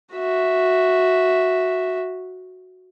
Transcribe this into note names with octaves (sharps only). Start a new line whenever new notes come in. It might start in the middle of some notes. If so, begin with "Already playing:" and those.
F#4 E5